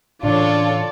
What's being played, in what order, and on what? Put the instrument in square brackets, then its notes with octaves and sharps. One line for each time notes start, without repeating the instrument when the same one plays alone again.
[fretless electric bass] A2 C#3 E3 [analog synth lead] D4 [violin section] F4 A4 C#5 [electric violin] D5